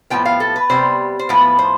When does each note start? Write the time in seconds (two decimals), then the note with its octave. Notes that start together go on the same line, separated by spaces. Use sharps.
0.10 A2 F3 B3 G5
0.25 F5
0.40 A4
0.56 B4
0.70 C3 G3 B3 C5
1.19 C5
1.29 A2 F3 B3 B4
1.59 C5